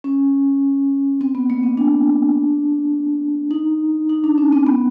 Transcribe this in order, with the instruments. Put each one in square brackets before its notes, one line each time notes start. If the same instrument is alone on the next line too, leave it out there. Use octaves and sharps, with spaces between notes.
[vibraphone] C#4
C4
B3
A#3
C4
D4
D#4
D#4
D4
C#4
C4
B3